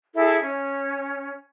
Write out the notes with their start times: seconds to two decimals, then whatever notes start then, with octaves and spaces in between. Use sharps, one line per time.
0.15 E4 G#4 A4
0.42 C#4